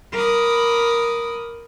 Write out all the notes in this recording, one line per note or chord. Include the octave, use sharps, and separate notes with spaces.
A#4 B5 D6 D#6